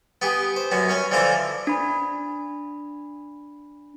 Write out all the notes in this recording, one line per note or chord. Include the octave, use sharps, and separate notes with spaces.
B3 G4 G#4
C5
F#2 F#3 B3
C#4 C#5 G#5
D3 E3 F3 C5 B5 D6
D4 B5